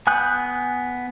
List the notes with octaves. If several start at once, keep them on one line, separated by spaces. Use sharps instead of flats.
B3 G#5 D#6 F#6 G6